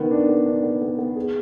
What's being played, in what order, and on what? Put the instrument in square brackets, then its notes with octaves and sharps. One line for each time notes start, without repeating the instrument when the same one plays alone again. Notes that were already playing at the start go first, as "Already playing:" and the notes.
Already playing: [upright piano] D#3 B3
D4
B3
D4
B3
B3
B3
G#4